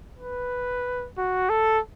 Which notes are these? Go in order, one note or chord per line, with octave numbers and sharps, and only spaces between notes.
B4
F#4
A4